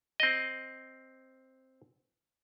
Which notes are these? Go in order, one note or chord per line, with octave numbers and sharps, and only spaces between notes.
C4 D#5